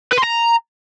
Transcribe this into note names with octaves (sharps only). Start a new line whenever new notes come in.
B4
C6
A#5